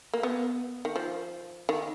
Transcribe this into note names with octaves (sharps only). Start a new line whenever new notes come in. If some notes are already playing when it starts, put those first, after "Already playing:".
A#3
B3
D#3
F3
D#3